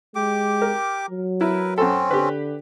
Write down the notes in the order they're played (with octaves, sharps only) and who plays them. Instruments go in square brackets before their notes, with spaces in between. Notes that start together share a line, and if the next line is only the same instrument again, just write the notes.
[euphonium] G#3 [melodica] G4 D6
[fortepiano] A#4
[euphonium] F#3
[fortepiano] E4 [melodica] A#4 B4
[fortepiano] F#2 A4 [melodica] C4 C#4
[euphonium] D3 [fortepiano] G4 B4